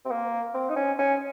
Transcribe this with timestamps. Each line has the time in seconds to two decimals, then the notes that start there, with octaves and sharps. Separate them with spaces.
0.05 C4
0.11 A#3
0.54 C4
0.69 D#4
0.76 C#4
0.99 C#4